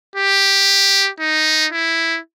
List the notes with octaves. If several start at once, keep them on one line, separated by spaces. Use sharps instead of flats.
G4
D#4
E4